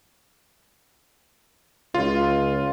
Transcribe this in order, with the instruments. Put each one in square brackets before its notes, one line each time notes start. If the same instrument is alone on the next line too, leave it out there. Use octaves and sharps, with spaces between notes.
[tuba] C#2 [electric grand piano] F4